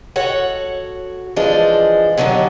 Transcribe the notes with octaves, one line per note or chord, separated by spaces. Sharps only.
F#4 A4 C#5 F#5
E3 F3 G#3 D4 C5 D#5
D#2 A#2 D3 D#3 F#3